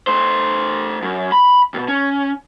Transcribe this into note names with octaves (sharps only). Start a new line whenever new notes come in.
A3 C5
F#2
B5
D#2 B2
C#4